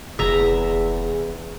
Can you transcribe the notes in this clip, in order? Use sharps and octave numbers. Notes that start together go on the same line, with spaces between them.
F1 E2 E4 G#4 E5 A#5